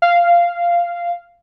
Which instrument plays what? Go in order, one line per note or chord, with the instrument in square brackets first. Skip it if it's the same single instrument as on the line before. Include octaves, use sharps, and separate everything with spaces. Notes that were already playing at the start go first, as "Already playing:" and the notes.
[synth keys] F5